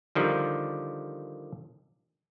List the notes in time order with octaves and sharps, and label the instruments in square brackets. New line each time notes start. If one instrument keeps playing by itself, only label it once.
[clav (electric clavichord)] D3 D#3 F3 G3